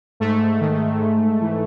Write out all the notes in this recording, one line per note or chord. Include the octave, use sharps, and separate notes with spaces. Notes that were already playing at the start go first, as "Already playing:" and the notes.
G#2 A3
D#3
G#2
E3